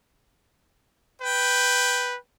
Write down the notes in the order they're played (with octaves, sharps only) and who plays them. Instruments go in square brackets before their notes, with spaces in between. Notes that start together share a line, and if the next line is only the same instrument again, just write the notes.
[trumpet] B4 [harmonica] G5